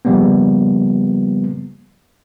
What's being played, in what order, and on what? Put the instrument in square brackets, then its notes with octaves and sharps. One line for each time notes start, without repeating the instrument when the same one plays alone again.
[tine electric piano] C#3 F3 G3 A#3 B3